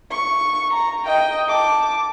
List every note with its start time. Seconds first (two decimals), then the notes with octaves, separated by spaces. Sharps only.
0.11 C#6
0.74 A#5
1.05 D#5 G5
1.49 A5 D6